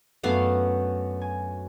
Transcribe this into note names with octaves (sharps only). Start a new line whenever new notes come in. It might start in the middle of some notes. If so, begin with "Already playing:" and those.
F#2 F#3 A3 B3 D4 F5
G#5